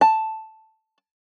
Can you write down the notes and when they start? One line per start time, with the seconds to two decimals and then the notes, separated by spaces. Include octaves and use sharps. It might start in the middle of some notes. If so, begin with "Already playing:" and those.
0.01 A5